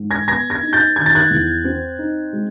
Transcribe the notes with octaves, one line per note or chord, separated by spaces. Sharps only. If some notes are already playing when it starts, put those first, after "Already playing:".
Already playing: G#2
G#6 A#6
B3 G#6 A#6
G#6 A#6
D#4
G6 A6
D#3 G#6
A6
F#6 G#6
E2
C4
D#4
G#3